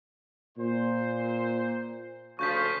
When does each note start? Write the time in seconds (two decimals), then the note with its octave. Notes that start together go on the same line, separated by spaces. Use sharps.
0.57 A#2 C5
2.39 D2 C#3 F3 C#6 G6 B6